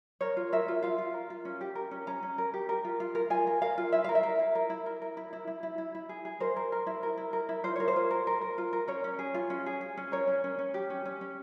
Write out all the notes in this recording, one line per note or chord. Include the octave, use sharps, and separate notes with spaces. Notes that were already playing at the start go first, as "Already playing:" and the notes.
A#4 C#5
F4
A#4 E5
F4
F4 F5
F4
A#4
F4
C#4
G4
A#4
C#4
C#4 A#5
C#4
A#4
G4
A#4
F4
F4
A#4
F4 G#5
A#4
A#4 F5
F4
E4 E5
A#4 F5
E5
A#4
E4
A#4
E4
A#4
A#4
E4
E4
E4
E4
E4
E4
G#4
G#4
A#4 C5
A#4
A#4
E4
A#4
E4
A#4
E4
F4 C5
A#4 C#5
C5
F4
A#4
A#4
A#4
F4
A#4
C#4 C#5
C#4
G#4
F4
C#4
G#4
G#4
C#4
A#4 C#5
C#4
C#4
C#4
G4
C#4
C#4
C#4